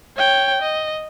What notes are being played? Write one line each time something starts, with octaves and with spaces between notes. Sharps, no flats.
C#5 G5
D#5